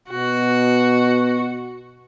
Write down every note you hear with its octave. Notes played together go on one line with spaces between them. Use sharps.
B2 F#4